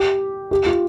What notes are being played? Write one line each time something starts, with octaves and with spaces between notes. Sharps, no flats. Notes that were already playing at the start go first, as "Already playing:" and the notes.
Already playing: G4
G4
F4